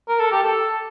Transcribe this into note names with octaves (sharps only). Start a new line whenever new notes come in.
A#4
A4
G4
A4